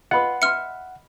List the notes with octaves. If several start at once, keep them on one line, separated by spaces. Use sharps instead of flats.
F4 B4 D#5 F#5 B5 D#6
E5 C6 F6 C#7